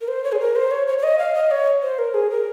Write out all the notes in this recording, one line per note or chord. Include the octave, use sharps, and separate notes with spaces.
A#4
C5
C#5
G#4
A#4
C5
C#5
C#5
C#5
D#5
F5
D#5
C#5
C5
A#4
G#4
A#4